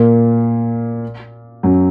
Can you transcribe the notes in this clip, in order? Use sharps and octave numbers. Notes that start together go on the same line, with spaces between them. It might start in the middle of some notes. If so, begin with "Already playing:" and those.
Already playing: A#2 A#3
F#2 F#3